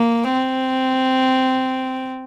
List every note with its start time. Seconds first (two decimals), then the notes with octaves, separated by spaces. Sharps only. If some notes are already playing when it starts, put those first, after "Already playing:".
Already playing: A#3
0.33 C4